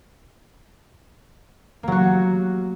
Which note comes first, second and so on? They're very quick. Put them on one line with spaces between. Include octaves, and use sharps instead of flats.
A#3 F#3 F#4